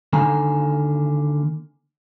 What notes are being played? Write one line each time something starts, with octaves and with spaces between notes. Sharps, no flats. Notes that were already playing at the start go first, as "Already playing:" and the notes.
D3 D#3 A#3 G#5 A#5